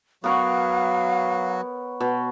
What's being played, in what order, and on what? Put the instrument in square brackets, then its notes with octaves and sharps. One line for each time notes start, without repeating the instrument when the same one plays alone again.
[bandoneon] F#3 F#4 [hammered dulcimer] B3 A#4 C#5 [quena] F5
[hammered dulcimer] B2